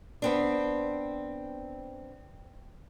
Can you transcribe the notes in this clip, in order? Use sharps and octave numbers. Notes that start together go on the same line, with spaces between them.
B3 C4 D4